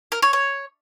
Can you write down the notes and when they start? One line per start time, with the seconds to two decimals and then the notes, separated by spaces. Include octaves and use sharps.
0.12 A#4
0.22 C#5
0.33 C#5